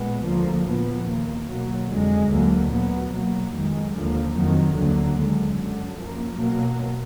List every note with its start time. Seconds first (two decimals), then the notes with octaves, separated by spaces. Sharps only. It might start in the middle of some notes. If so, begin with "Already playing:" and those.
Already playing: A#2 G#3 B3
0.25 D2 D3 F3 A#3
0.66 A#2 F3 B3
1.06 D#2 D#3 A#3
1.48 B2 F#3 A#3
1.89 F2 D3 G#3
2.30 D2 D3 F#3 A#3
2.70 A#2 F#3 B3
3.11 B2 F#3 A#3
3.53 F2 D#3 G#3
3.94 D#2 D3 F3 A#3
4.35 F2 D#3 F#3
4.75 D2 D3 F#3 A#3
5.16 D#2 D3 G#3
5.57 F#2 D3 F#3
5.98 F#2 F3 A#3
6.39 B2 F#3 A#3